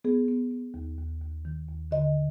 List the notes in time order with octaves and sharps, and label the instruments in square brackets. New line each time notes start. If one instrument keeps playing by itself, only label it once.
[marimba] B3 G#4
B3
B3
D#2
D#2
D#2
D#3
D#2
D3 D#5